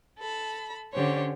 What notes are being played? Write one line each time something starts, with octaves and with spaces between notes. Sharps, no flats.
A4 B5
D3 C#4 G4 C5 C#5